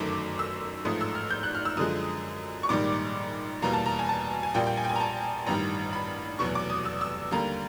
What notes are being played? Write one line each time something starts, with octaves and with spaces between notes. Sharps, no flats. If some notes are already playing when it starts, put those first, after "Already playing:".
Already playing: G1 F#2 D#3 F#3 A3 D6
E6
A1 G#2 F3 A3 D#6
E6
F6
G6
F#6
F6
E6
F#2 D3 F3 G#3 D#6
C#6
A#1 G#2 D#3 G3 D6
E2 B2 G3 A#3 A#5
A5
A#5
G#5
A5
G#5
A#1 A#2 G3 A#3 G5
G5
G#5
G5
G#5
A#5
A5
A1 G2 D#3 G3 A#5
B5
F1 E2 B2 F#3 C#6
D6
D#6
E6
E6
D#2 D3 G3 A#3 A#5